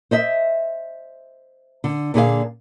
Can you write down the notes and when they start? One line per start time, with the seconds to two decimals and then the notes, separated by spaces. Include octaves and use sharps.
0.11 C5 D#5 E5
1.84 D3
2.14 A#2 D3 G#4 F5